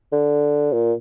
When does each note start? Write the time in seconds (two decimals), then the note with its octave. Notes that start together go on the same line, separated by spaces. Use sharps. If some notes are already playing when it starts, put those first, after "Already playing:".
0.12 D3
0.72 A#2